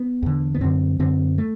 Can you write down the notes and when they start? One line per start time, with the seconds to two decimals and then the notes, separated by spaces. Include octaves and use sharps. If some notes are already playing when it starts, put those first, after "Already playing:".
Already playing: B3
0.23 E2 D3
0.55 B3
0.61 F#2 D3 C4
0.99 F#2 D3 C4
1.38 A3